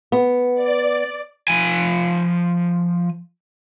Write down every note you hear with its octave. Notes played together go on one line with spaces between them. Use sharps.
B3
D5
F3 G#5